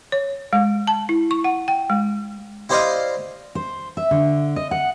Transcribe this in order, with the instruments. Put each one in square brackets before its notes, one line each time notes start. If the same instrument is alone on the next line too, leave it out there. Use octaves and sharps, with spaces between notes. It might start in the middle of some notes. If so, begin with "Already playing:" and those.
[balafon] C#5
G#3
A5
E4
C#6
F#5
G5
G#3
[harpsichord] E4 G4 C5 D5 D#5 F5
[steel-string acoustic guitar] C5
E5
D3
D#5
F#5